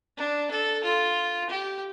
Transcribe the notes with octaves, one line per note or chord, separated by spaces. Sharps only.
D4
A4
F4
G4